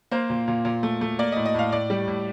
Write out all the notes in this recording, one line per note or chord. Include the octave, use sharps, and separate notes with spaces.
A#3 C5
A#2
A#2
A#2
A3
A3
A#3 D5
A2 D#5
D#5
A2 F5
A2 D5
G3
A2